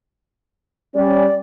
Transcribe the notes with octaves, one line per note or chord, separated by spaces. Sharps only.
G3 C#4 D5